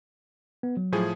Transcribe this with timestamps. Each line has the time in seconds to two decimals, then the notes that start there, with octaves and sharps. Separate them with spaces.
0.63 B3
0.77 F#3
0.92 A2 F3 G#4